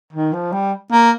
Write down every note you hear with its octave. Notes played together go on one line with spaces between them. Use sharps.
D#3
F3
G3
A#3